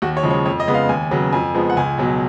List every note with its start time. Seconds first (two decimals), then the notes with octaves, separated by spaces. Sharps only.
0.02 D#2 F#4
0.17 C#5
0.23 C#3 F3 G#3
0.30 C#5
0.46 F2 C#5
0.60 D#5
0.67 C#3 G#3 B3
0.74 F5
0.89 D#2 G#5
1.11 C#3 F#3 B3
1.33 F2 G#5
1.55 F3 G#3 B3
1.70 F#5
1.77 C#2 G#5
1.98 B2 F#3